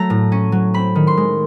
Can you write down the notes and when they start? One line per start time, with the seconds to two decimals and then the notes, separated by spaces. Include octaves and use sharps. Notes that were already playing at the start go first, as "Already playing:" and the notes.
Already playing: F#3 A3 A#5
0.10 A2
0.32 C#4
0.52 F#3
0.74 C4 B5
0.95 D#3
1.07 C6
1.17 G#3